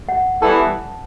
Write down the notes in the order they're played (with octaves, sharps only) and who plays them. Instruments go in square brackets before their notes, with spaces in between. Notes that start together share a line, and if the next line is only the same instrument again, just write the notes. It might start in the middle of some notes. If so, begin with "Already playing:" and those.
[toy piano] F#5
[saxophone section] E3 G3 B3 E4 A4 [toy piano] A5